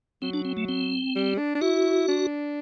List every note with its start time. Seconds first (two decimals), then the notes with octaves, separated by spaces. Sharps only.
0.22 F#3 C4
0.34 D4
0.45 C4
0.57 A3
0.69 C4
1.15 G3
1.38 D4
1.55 D4
1.61 E4 F#4
2.08 D4